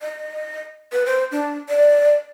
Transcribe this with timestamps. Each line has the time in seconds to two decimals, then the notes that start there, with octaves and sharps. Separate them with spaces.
0.02 D#5
0.92 B4
1.06 C5
1.32 D4
1.69 D5